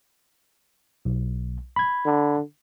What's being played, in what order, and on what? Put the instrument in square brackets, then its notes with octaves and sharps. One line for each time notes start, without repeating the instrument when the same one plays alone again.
[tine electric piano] B1
B5 G#6
[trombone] D3